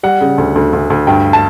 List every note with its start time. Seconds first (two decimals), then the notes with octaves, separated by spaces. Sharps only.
0.03 G3 F#5
0.21 C#3
0.38 D2
0.56 D2
0.73 D2
0.90 D2
1.07 G2 G5
1.33 A5